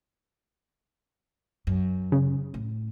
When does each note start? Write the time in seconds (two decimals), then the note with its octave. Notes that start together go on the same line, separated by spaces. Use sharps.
1.67 F#2
2.12 C#3
2.54 A2